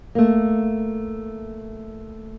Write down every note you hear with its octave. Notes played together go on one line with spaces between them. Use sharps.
A3 A#3